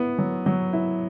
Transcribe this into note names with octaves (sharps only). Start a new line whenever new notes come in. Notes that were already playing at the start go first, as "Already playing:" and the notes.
Already playing: B3 E4
F#3
F#3
E4